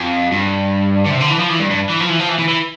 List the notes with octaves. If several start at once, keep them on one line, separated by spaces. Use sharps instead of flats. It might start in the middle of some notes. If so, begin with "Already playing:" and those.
Already playing: F2
G2
D3
C3
D3
E3
F3
E3
G2
G2
E3
F3
E3
F3
E3
E3
E3